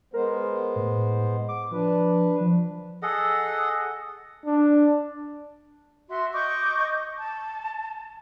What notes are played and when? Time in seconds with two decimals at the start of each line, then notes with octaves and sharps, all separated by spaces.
0.14 G#3 B3 A#4 C5
0.76 A2
1.49 D6
1.71 F3 D4 B4
2.40 F3
3.02 G#4 A4 D#5 F#5
4.46 D4
6.08 F#4 E5 C6
6.33 D#5 C#6 D6 G6
7.18 A5